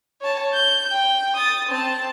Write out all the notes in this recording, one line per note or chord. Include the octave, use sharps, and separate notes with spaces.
C#5 A5
G6
G5
D#6 A6
C4 A5